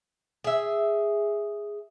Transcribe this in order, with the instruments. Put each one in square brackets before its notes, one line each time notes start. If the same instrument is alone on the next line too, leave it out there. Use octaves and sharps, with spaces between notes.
[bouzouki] G#4 E5